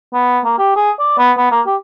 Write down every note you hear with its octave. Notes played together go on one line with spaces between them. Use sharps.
B3
A#3
G4
G#4
D5
B3
B3
A#3
G4